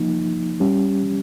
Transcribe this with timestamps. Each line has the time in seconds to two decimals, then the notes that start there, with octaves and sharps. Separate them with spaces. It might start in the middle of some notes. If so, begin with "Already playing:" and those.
Already playing: F3 A#3 D#4
0.60 G3 C#4 G4